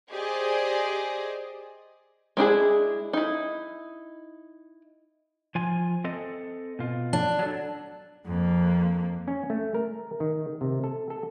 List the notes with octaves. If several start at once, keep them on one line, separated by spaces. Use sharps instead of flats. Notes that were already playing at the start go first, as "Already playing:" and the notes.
G4 G#4 C5 D5 D#5 G#5
G#3 D4 E4 G#4
D#4 E4
F3 F4 G#5
C4 A4 D#5
B2 F4
D4
F#3 A4
F2 A#3
C#4
A3
A#4
D#3
C3
A4
A4